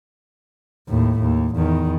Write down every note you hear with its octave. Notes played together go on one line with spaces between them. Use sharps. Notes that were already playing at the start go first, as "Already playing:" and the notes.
D#2 A2
D#2
E2 D#3